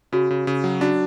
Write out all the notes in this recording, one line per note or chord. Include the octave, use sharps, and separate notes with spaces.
C#3 F#4
C#3
C#3
F#3
D4 F#4